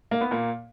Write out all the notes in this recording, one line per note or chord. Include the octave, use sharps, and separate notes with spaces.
A#3
B3
A#2 A#3